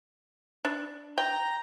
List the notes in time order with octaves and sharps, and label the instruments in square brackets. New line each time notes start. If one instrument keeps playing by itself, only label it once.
[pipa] D4
[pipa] G5 [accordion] A#5